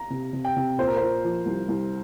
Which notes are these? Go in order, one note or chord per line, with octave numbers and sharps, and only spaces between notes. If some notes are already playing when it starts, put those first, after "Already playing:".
Already playing: A#5
C3
C3
G5
C3
A#2 C5
A#4
A#2 C5
F3
C2
C2